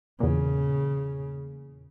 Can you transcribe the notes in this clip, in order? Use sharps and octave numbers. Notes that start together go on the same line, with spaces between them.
E2 A#2 C#3